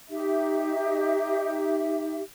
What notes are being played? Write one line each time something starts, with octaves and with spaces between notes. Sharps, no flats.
D#4 G4 E5